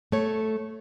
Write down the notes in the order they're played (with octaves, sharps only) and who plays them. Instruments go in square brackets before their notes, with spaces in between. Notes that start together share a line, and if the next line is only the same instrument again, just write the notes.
[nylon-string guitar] A3 C#5